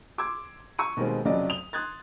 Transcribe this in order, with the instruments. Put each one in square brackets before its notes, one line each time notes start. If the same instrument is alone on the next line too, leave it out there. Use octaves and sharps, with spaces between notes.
[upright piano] C6 D6 E6 G#6
C#6 E6 D#7
B2 D#3 G3 G#3 A#3 C4
F1 F2 C#3 F#3 D5 D#5
D#6 F7 G7
C6 D#6 F#6 G#6 A6